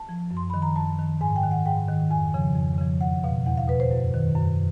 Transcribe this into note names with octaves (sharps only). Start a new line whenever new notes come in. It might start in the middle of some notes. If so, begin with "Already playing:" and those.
Already playing: A5
F3
F#2
C6
D#3 B5
A#5
F#2 A5
D#3
G#2 G#5
G5
D#3
F#5
G#2 G5
D#3
F2 G#5
C#3 F3
F2
C#3 F3
E2 F#5
B2 F5
E2 F#5
F5
B2 B4
C5
F#2
D#3
F#2